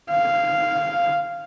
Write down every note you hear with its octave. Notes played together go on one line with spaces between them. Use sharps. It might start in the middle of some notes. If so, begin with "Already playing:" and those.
F5